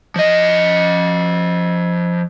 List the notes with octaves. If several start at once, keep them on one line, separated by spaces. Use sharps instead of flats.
F3 D#5